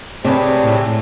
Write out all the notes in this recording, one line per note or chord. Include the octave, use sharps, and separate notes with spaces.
C3 D4 G4 G#4 B4 C#5
A2